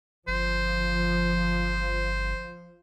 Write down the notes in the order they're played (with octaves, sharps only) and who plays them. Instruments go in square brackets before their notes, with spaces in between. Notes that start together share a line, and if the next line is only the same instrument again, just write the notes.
[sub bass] G1 [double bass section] F3 [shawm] C5